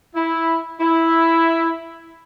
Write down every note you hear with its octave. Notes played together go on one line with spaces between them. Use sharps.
E4
E4